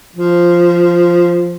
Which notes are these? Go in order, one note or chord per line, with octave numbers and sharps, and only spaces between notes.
F3